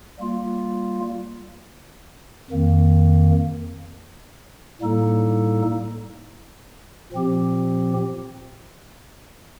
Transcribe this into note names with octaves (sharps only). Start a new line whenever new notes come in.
G3 A#3 F4
F2 D#3 A#3
A2 G3 A#3 D#4 A4
A#2 F3 C4 G4